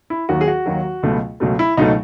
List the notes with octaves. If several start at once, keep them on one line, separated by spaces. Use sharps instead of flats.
E4
D#2 D#3 F#3 F#4
G#4
F#4
D#2 D#3 F#3
C#2 B2 F#3 A3
C#2 B2 F#3 A3
E4
C#2 B2 F#3 A3 D#4